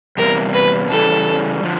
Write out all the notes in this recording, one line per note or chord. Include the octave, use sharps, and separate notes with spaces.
E2 C3 G3 A#3 A#4
B4
C#3 E3 G3 A4
D3 F3